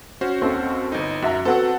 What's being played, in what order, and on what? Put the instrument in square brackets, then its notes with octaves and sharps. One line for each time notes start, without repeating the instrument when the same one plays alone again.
[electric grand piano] C#4 F#4 C5
[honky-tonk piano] D#2 C4 A4
[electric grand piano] G1 D#4
[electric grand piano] F#2 [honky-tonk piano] F#4 E5 A#5
[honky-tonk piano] F#3 B3 C4 [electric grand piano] A4 F#5